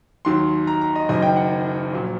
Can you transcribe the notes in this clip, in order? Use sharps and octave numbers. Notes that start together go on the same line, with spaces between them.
D#2 D#3 F#3 C6
A#5
A#5
D#5
F#1 F#2 D#3 F#3 D#5
G5
F#5
A#1 A#2 F#3